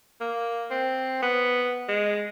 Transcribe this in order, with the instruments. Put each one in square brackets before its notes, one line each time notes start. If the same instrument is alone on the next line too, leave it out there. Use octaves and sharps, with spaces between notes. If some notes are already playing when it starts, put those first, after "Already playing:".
[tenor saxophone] A#3
C4
B3
G#3